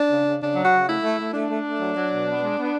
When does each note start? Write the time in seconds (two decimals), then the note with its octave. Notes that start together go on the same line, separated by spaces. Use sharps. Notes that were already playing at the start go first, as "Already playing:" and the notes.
Already playing: D4
0.09 C#3
0.25 C#3
0.40 C#3 D4
0.56 F#3
0.64 F#4
0.71 C#3
0.87 A3 E4
1.02 A3
1.18 A3
1.33 A3 D4
1.48 A3
1.64 A3
1.80 F#3
1.94 F#3
2.10 B2
2.26 B3
2.41 G#3
2.57 B3